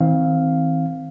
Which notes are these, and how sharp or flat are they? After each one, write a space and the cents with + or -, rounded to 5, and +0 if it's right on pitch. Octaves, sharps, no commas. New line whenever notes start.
D#3 +45 C4 +0 F5 +0